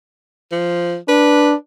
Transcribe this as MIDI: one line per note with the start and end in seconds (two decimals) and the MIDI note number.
0.52 0.96 53
1.09 1.54 62
1.09 1.53 71